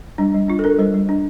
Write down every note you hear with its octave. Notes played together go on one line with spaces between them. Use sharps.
G3 D4
G3
D4 F4
A4
D4 A#4
G3 C5
G3
D4